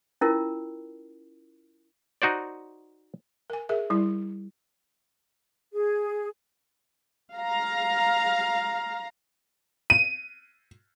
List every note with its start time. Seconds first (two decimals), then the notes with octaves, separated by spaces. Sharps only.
0.21 C#4 E4 F4 A#4
2.22 D#4 F#4 C5 D5
3.50 A#4 G#5
3.69 G#4 A#4 E5
3.90 G3 E4
5.73 G#4
7.36 F5 A#5
9.90 D#7